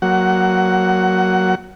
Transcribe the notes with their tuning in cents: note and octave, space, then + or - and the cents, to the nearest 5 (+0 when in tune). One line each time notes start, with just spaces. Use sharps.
F#3 +0 A#3 +0 F#5 +15